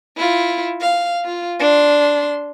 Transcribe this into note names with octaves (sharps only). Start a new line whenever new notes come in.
E4 F4
F5
F4
D4 C6